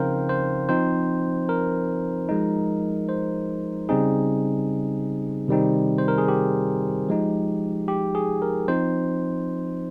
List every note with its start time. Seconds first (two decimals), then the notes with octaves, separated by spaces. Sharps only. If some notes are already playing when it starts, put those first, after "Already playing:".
Already playing: C#3 F3 C4 D#4 A#4 C5 F5 G5
0.29 C5
0.69 F3 C4 D#4 C5
1.49 A#4
2.29 F3 G#3 D#4
3.09 C5
3.89 C#3 G3 C4 D#4 G#4
5.48 C3 D#3 G3 C4 D#4
5.98 C5
6.08 A#4
6.18 G#4
6.28 G4
7.09 F3 G#3 D#4
7.88 G4
8.15 G#4
8.42 A#4
8.68 F3 C4 D#4 C5